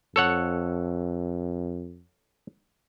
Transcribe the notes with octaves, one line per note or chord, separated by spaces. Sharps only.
F2 A4 C#5 F#5